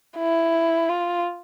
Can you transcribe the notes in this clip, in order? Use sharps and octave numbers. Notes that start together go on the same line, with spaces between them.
E4
F4